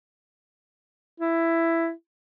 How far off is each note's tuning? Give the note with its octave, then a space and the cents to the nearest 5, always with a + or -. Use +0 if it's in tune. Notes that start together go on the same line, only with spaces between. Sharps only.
E4 +10